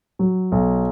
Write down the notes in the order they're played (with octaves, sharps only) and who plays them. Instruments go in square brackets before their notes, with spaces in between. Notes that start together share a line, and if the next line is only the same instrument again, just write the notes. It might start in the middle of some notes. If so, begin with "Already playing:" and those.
[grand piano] F#3
B1